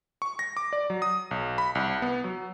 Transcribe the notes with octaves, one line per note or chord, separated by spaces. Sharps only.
C#6
A#6
D6
D5
F#3
D#6
B1
B5
C2
B3
F#3